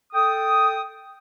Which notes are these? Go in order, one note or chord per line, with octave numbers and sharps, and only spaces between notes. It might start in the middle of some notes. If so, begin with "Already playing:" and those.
A4 G5 D#6